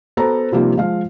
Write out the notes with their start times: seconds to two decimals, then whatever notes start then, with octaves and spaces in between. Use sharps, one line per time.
0.17 B3 F#4 A4 C5 A#5
0.52 C3 F3 G3 A#3 D#4 F4
0.77 F3 G#3 F5